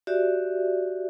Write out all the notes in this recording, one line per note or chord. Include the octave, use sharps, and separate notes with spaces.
F#4 G4 D5 E5